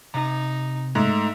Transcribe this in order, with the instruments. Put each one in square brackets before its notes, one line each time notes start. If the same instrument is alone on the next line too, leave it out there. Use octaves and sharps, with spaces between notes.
[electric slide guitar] C3 A#5 [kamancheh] D#4
[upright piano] G#2 [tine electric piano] A3 D#4 [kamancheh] E5